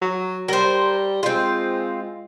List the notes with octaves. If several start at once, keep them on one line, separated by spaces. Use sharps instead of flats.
F#3
G3 A#4 C5
G#3 C4 F4